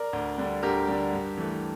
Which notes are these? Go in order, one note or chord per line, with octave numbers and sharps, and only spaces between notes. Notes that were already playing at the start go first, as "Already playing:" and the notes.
Already playing: A#4 D5
D2
D3 G3
D2 G4 A#4
D3 G3
G2
E3 A3